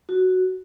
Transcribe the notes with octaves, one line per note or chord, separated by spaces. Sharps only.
F#4